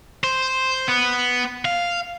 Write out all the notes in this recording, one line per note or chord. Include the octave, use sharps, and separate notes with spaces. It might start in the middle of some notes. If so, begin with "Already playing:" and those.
C5
B3
F5